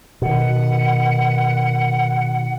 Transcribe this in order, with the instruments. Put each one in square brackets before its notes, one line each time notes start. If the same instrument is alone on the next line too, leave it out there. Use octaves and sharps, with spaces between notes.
[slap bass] B2 D#3 [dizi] F#5